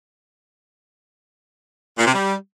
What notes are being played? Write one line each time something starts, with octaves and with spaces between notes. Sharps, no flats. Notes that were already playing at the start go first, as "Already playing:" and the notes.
A#2
C3
G3